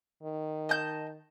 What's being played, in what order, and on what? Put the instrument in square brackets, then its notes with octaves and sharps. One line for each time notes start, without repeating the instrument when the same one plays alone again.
[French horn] D#3
[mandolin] D#5 A5 G6